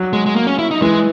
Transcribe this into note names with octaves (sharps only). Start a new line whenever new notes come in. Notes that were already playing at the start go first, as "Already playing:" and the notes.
Already playing: F#3
G#3
G#3
A#3
C#4
E4
D#4
E3 G#3